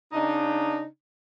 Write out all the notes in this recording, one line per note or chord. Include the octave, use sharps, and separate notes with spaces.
C#3 D4 D#4